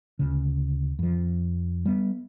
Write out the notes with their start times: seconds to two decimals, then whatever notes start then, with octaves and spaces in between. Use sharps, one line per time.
0.19 D2 C#3
0.99 F2 F3
1.85 G3 B3